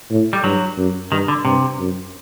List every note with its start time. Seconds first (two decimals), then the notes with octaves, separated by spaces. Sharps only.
0.11 A2
0.33 G3
0.44 G2 F#3
0.77 F#2
1.12 G2 D#3
1.28 D3
1.45 G2 C3
1.79 F#2